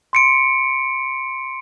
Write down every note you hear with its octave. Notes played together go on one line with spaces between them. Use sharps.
C6 C#7 D7